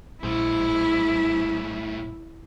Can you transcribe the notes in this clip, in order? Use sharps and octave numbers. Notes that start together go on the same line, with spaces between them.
A#1 A2 E4 C5